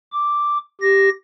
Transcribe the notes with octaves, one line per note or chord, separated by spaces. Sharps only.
D6
G4 A#6